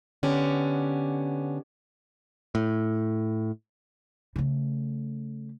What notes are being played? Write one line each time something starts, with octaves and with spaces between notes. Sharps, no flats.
D3 B3 C#4 G4
A2
C#3 A3